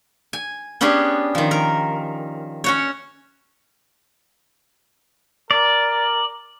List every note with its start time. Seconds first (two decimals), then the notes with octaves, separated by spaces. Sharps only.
0.33 G#5
0.81 B3 C#4 D4 G4 G#4
1.35 D#3 F3
1.51 A#4
2.64 C#4 F#4 C#5
5.51 A#4 D5